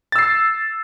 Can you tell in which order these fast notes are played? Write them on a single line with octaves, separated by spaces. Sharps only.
A6 E6 C7